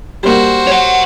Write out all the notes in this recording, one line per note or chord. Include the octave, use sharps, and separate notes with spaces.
G3 A#3 F#4 C5
C#5 F#5